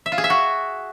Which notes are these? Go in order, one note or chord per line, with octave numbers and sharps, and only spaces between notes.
E5
F4
G#4
E5
F#4